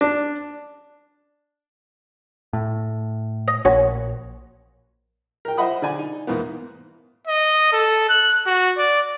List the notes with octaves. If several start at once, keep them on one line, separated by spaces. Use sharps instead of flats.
D4
A2
D#5
A#1 C#4 F#4
A#4 G5
C5 D#5 E5 F#5 B5 D#6
D3 D5 G#5
D#4
E2 G#2 A#3 B3
D#5
A4
F#6
F#4
D5